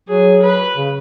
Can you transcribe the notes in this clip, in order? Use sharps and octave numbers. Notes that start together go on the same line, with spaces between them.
F#3 G#4
B4
C#3